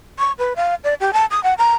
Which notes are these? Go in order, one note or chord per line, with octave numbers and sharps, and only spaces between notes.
C#6
B4
F5
D5
G4
A5
D#6
F#5
A#5